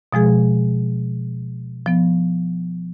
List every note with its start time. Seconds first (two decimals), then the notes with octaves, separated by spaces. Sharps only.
0.13 B2 F3 G#3 G#4
1.86 F3 B3